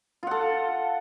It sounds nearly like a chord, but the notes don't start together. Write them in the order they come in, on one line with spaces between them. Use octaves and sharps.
F4 F#5 A4